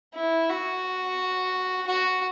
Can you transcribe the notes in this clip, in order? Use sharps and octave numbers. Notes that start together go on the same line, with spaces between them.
E4
F#4
F#4